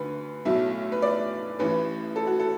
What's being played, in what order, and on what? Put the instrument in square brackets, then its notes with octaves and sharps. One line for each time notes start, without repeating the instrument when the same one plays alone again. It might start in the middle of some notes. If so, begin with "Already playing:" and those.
Already playing: [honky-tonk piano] D2 D3 B4
B1 A2 F#3 A3 E5
B4
D5
A1 A2 E3 B4
A4
F#4
A4